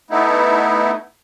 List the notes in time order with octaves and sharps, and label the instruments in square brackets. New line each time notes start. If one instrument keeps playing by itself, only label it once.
[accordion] A3 B3 D#4 E4